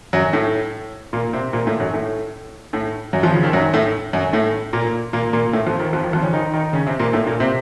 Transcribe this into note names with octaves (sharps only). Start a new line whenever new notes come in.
F#2 F#3
A2 A3
A#2 A#3
C3 C4
A#2 A#3
A2 A3
F#2 F#3
A2 A3
A2 A3
F#2 F#3
F2 F3
C#3
D#2 D#3
F#2 F#3
A2 A3
F#2 F#3
A2 A3
A#2 A#3
A#2 A#3
A#2 A#3
A2 A3
F2 F3
D#2 D#3
F2 F3
D#2 D#3
F2 F3
C#3 C#4
D#3 D#4
D#3 D#4
C#3 C#4
C3 C4
A#2 A#3
A2 A3
A#2 A#3
C3 C4